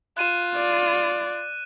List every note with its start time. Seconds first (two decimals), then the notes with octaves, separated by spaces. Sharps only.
0.17 F4 F#6 D#7 E7
0.55 D5